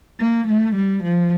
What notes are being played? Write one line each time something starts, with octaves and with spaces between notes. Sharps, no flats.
A#3
A3
G3
F3